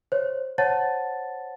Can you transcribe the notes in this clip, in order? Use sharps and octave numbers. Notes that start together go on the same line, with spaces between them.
C5 C#5
C5 C#5 F#5 A5 A6